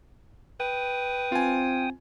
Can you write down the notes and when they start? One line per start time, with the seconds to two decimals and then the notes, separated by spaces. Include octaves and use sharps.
0.60 B4 G5 D#6
1.32 C4 F4 G#5